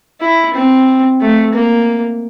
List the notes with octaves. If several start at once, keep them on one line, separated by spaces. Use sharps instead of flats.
E4
C4
A3
A#3